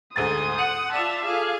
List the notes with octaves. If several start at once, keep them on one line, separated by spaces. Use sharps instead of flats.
D2 G#2 C5 D#6 A6
F#5 C#7
F4 D5 E5 A5 D6
F4 G#4 A4 F5 D6